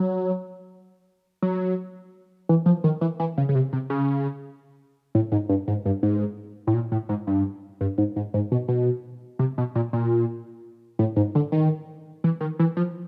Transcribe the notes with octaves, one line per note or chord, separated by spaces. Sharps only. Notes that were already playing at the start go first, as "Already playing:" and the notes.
Already playing: F#3
F#3
E3
F3
D#3
E3
E3
C#3
C#3
C3
C3
C#3
A2
G#2
G2
G#2
G2
G#2
A2
A#2
A2
G#2
G2
G2
G#2
G#2
G#2
B2
B2
C3
B2
A#2
A#2
A2
G#2
D3
D#3
E3
D#3
E3
F3